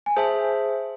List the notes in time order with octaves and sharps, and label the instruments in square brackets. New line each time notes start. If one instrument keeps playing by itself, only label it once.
[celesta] G#5
[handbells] G#4 C5 E5 [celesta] A5